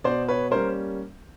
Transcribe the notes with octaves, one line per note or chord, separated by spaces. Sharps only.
B2 C5 D5
B4 C#5
G3 A#3 C#4 A#4 C5